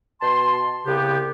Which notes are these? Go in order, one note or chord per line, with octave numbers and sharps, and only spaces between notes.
B2 A5 C6
C2 C#3 B3 G4